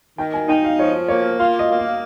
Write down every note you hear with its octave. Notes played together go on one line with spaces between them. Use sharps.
D#3 G5
G#5
D#4 G5
F5
F3 C#5
A#3 C#5
F4 F5
D#5
A#3
F5